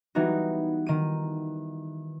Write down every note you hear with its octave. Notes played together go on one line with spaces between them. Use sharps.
E3 G3 B3 D#4 F#4
D#3 D#7